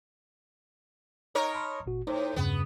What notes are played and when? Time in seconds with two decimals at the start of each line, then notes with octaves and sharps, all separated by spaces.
1.35 D#4 A#4 C#5
1.54 A5 B5 C6
1.86 G1 A#2 F#4
2.07 A2 D#4 C5 C#5
2.36 E2 G2 C#3 B3